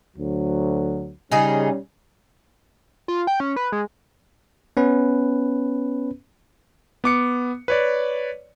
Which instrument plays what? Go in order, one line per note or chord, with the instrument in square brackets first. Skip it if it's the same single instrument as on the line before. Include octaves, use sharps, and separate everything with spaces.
[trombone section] D2 F#3
[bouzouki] C#3 D#4 G#4 [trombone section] G3 C#4
[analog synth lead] F4
G5
C#4
B4
G#3
[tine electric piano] B3 C#4 B4
[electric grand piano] B3 D6 C#7
B4 C#5 D5